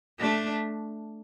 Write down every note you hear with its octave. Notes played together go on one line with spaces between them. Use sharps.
A3 D4